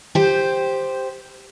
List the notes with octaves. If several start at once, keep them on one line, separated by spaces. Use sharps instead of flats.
G4 C5